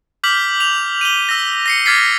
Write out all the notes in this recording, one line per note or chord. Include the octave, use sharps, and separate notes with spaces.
D6 F6 G6 B6 F#7
F7
D#7 G7
E6 A#6
A#6 C7 C#7
D6 F6 G#6 A6 B6 C7